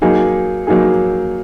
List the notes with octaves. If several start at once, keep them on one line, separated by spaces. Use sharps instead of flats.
F#3 A#3 D#4 G#4
F#3 A#3 D#4 G#4